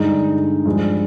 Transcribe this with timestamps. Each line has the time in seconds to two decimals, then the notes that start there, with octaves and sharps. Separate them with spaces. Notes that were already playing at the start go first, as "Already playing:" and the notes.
Already playing: G2 D3 G#3 D#4
0.65 G2 F3 G#3